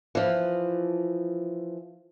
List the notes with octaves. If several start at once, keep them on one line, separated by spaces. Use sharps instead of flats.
E3 F3